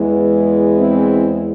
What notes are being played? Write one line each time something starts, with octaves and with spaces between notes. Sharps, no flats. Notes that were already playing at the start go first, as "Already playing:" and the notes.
Already playing: E2 E3 G#3
C4 E4